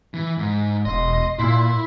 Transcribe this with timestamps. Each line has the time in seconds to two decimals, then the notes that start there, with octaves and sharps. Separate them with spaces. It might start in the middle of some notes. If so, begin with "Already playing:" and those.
0.14 E3
0.38 G#2
0.85 E1 D#5 C6
1.39 A#2 E4